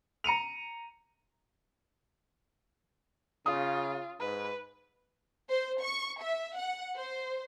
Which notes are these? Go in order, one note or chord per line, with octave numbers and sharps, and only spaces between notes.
A#5 C#7 D#7 F7
C#3 F4 D#6
G#2 B4
C5
C#6
E5
F#5
C5